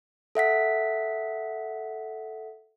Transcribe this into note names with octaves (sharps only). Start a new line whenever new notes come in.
A4 E5 F#5 B6